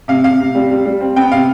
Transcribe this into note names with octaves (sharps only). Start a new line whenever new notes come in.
C3 F5
C3 F5
C3
G3
G3
G3
C4
B3 G5
C3 F5